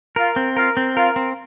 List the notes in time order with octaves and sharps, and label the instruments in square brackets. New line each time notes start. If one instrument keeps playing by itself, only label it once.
[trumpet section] F4 F5 [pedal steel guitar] A#4
[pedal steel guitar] C4
[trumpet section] F4 F5 [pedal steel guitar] A#4
[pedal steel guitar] C4
[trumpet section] F4 F5 [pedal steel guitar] A#4
[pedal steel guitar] C4